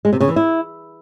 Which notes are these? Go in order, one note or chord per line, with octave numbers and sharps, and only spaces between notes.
G#3
C3
C#3
E3
E4